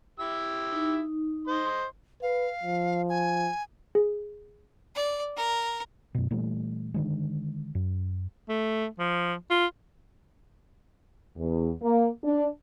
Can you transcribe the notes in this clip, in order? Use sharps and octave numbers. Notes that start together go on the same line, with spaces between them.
E4 G4 E6
D#4
C5 D#5 C6
B4 F5
F3
G#5
G#4
D5
A#4
F#2 B2
A#2 E3 G3 A3
D3 D#3 G#3
F#2
A3
F3
F4
E2
A#3
D4